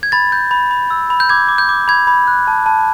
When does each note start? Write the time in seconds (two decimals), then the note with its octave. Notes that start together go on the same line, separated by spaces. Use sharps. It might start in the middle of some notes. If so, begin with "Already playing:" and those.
0.03 G#6
0.12 B5 A6
0.32 G6
0.51 B5
0.71 B5
0.90 E6
1.10 B5
1.20 G6
1.29 D6 G#6
1.49 D6
1.58 G6
1.69 D6
1.88 B5 G#6
2.07 B5
2.27 F#6
2.47 A5
2.66 A5